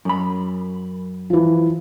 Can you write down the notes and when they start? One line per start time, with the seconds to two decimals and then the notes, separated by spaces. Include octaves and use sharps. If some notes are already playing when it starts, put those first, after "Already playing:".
0.05 F#2 B5
1.30 E3 F3